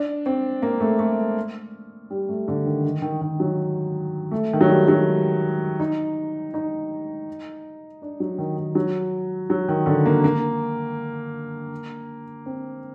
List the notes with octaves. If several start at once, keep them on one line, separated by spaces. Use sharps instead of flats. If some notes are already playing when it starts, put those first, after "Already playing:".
Already playing: D4
C4
A#3
A3
A3
G3
A3
D3
D#3
D#3
D#3
D#3
F#3
A3
D#3
F#3
G3
F#3
D#4
D#4
D4
F#3
D#3
D#3
F#3
F#3
D#3
D3
A#3
A#3
C4